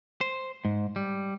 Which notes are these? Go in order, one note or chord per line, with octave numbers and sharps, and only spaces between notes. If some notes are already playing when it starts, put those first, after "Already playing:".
C5
G#2
G3